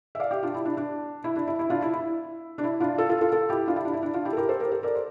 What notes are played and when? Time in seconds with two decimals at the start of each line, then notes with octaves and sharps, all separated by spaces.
0.15 E5
0.20 D5 F5
0.31 G4
0.43 D4 F4
0.55 E4
0.65 D4
0.77 D4
1.24 E4
1.36 D4
1.47 E4
1.59 E4
1.70 D4 F4
1.82 E4
1.93 E4
2.58 D4
2.64 E4
2.80 D4 F4
2.98 F4 A4
3.09 F4 A4
3.21 F4 A4
3.33 F4 A4
3.50 E4 G4
3.67 D4 F4
3.76 E4
3.85 D4
3.93 E4
4.03 D4
4.14 D4 F4
4.25 E4 G4
4.33 A4
4.37 G4 A#4
4.49 A4 C5
4.60 G4 A#4
4.72 A4 C5
4.83 A#4 D5
4.95 C5